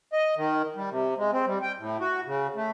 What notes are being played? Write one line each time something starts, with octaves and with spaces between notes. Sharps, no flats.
D#5
D#3
G3
C3
G#3
C4
G3
G5
A2
F#4
C#3
A3